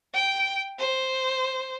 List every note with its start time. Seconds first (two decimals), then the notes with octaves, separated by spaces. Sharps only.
0.14 G5
0.79 C5